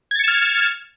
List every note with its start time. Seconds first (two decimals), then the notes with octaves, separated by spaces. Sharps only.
0.11 G#6
0.15 A6
0.19 C#7
0.24 E7
0.28 F6